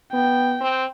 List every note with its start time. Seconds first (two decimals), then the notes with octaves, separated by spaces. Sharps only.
0.13 B3 G5
0.61 C4